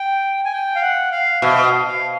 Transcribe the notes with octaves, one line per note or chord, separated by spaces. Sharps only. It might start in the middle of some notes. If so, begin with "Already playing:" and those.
Already playing: G5
G#5
G5
F5
F#5
F5
B2 E5
F5
F5